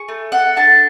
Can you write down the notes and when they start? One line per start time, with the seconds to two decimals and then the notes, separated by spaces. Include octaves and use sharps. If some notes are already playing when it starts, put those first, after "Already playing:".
Already playing: G#4 C#6
0.08 A3
0.32 A4 F#5
0.56 D4 A5